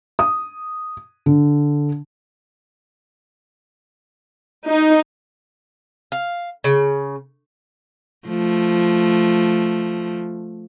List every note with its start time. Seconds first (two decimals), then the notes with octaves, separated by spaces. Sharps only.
0.19 D#6
1.26 D3
4.68 D#4
6.12 F5
6.64 C#3
8.28 F3 A3